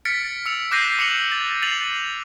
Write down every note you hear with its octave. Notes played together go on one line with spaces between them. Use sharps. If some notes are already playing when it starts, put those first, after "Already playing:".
F6 A6 B6 C#7 D7
E6 C#7 F7
D6 F#6 G6 A#6 C7 D#7
D6 C#7 F7 F#7
A6
A6 C7 D#7 F7 F#7